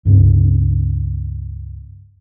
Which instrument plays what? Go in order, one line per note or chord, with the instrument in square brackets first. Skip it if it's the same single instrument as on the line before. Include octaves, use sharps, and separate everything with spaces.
[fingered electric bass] C#2 G2 C#3 C4